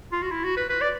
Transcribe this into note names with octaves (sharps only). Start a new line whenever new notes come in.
F4
F#4
E4
F#4
B4
B4
D5